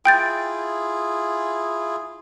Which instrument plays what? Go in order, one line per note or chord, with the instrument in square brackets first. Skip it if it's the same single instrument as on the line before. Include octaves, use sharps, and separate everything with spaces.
[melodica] E4 F4 G#4 [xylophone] G5 G6 A6